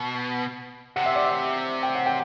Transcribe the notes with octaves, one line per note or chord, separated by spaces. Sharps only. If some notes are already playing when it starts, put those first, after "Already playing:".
Already playing: B2
C3 F#5
E5
D5
E5
G5
F#5
G5